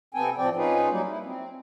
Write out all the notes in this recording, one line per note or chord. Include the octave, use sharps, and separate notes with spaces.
C3 B3 C4 A4 G5 G#5
A2 F3 C4 D5 G5
C#4 D#4 F4 G#4 B4
F#3 G3 A#3 D#4
E4
C4